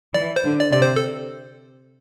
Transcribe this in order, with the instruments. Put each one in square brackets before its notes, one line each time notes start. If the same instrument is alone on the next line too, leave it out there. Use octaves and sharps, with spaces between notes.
[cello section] E3 [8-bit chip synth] D5
[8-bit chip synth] C5
[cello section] D3
[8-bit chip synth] D5
[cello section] C3 [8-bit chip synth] D5
[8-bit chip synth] C5
A4